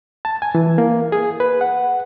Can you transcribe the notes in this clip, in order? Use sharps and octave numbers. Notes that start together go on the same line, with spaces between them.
A5
G#5
E3
A#3
G#4
B4
F#5